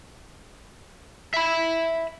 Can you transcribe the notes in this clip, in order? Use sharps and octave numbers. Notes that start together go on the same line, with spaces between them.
E5 B5